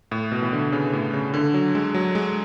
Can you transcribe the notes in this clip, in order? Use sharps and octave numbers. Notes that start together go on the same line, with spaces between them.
A2
B2
E3
D3
C#3
A2
C#3
D3
F#3
G#3
F#3
G#3